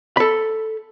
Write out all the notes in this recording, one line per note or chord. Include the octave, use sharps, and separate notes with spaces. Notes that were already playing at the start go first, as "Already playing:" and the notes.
A4 B5